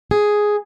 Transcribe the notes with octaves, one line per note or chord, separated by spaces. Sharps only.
G#4